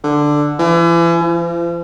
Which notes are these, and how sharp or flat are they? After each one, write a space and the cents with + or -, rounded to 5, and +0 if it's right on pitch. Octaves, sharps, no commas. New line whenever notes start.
D3 +5
E3 +35
F3 -45